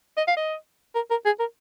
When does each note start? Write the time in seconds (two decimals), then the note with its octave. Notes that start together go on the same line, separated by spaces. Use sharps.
0.18 D#5
0.28 F5
0.37 D#5
0.95 A#4
1.11 A#4
1.26 G#4
1.40 A#4